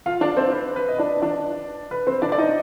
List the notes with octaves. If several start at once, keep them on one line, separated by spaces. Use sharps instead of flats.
F4 F5
D4 D5
C4 C5
B4
B4
D#5
D4 D5
D4 D5
B4
C4 C5
D4 D5
D5
D#4 D#5